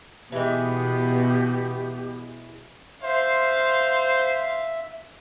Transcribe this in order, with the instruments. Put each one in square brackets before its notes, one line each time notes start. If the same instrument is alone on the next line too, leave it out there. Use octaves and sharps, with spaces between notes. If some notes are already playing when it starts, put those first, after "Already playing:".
[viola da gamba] B2 B3 [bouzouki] E3 G#3 [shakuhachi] G4
[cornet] C5 [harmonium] E5 [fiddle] F5 C6